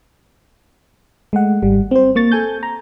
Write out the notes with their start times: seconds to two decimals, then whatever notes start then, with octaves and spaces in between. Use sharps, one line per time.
1.33 G#3 A3 F#5
1.63 G#1 G3
1.91 C4 C5
2.15 A#3 C#6 A6
2.32 A4 G#5 G6
2.63 A#5